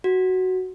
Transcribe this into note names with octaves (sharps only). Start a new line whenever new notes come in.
F#4